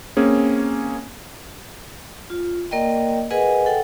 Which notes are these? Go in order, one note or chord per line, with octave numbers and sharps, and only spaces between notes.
A#3 C4 C#4 G#4
F4
A#3 A#4 D5 D#5 G5
G#4 A#4 B4 D#5 F#5 G#5
A4 F#5 G5